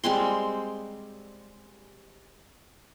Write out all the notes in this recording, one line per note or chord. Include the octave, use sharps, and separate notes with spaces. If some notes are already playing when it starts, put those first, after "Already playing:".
G3 G#3 C4 C6